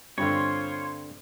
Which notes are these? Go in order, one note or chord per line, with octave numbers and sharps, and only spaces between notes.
G2 D3 C4 F4 C5 C#5